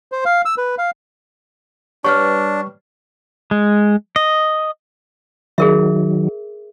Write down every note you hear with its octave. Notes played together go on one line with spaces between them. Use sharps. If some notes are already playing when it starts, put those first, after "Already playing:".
C5
F5
E6
B4
F5
G3 B3 D4 C#5 C#6 F6
G#3
D#5
D#3 F#3 G#4 A#4 E5